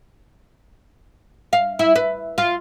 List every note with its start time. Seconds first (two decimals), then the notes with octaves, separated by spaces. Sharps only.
1.53 F5
1.79 E4
1.96 B4
2.38 F4